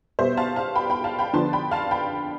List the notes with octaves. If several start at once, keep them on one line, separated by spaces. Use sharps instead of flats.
B2 G3 B3 C5 E5
F5 A5
F5 A5
G5 B5
G5 B5
F5 A5
G5 B5
D3 F3 B3 D4 A5 C6
G5 B5
F5 A5
G5 B5